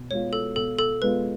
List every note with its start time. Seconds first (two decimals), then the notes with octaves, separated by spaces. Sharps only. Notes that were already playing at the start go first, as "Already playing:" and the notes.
Already playing: B2
0.10 G#3 B3 F4 C#5
0.33 A4
0.56 B2 A4
0.79 A4
1.02 G#3 B3 F4 B4